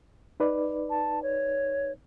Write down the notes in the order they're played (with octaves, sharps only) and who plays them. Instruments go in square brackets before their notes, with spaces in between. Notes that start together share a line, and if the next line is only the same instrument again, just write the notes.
[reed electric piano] D#4 B4 D5
[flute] A5
C#5